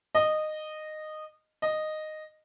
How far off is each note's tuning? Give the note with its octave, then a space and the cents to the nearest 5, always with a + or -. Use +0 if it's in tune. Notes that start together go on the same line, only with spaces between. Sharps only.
D#5 -15
D#5 -10